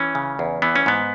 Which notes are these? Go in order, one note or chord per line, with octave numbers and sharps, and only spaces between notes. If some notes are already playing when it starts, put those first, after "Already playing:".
Already playing: E3 C#4
C#3
E2
E3 B3
C#4
G#2 B3